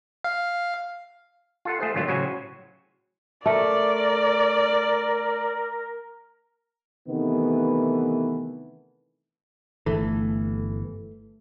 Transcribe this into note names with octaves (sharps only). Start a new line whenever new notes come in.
F5
F4 A4 F#5
A3 G#4 C5
G#1 D3 F#3 A3 F4
A2 C#3 F#3 F#4 C5 G#5
A3 A#4 D5
C3 D#3 E3 A3 B3
G1 E3 A3